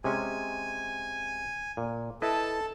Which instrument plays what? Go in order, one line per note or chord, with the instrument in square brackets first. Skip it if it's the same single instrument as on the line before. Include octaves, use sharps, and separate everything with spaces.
[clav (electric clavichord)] C3 G#3 C#4 [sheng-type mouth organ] G#5
[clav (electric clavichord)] A#2
[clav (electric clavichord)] E4 B4 D#5 [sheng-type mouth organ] A4 A5